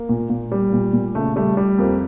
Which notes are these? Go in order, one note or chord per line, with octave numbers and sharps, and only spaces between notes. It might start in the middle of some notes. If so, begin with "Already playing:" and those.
Already playing: A#3
A#2
A#2
G3
A#2
A#2
C#3 A3
G3 A3
G3
F2 A#3